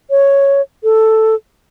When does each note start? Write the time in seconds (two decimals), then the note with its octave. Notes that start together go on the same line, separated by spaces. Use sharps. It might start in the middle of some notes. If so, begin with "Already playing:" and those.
0.10 C#5
0.84 A4